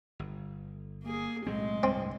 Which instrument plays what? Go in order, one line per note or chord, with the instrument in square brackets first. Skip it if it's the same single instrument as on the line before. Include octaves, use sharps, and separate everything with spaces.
[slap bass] G1
[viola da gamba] A#3 G#4
[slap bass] B1 F#3 C4 [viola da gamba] A2 G#3
[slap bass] C2 G2 D3 [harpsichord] C4